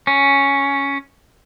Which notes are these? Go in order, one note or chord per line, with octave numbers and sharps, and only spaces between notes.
C#4